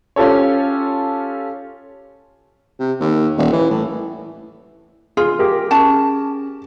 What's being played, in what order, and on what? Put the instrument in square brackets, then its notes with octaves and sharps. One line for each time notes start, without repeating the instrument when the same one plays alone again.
[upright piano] C#4 F4 G4 A4 C#5
[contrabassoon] C3
D#2
D#1
E3
A2
[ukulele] F4 [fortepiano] G#4
[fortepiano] G4 G#4 A#4
[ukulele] C#4 A5